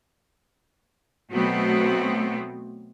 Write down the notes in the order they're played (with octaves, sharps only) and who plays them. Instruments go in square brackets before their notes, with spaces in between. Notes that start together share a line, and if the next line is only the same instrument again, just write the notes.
[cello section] B2 F#3 A3 B3 C4